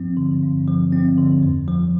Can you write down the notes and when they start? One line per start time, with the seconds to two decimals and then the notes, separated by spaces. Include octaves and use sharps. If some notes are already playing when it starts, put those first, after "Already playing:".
Already playing: G2 F3 C4
0.17 D3
0.43 G2
0.68 F3
0.92 C4
1.18 D3
1.43 F2
1.68 F3